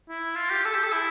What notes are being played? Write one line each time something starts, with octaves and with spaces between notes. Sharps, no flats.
E4
F4
G4
A4
G4
A4
E4